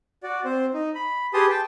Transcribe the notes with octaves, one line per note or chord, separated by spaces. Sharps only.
F#4 D5
C4 C5
D#4
B5
G4 G#4 B4 A5 C6 D#6
G5 A5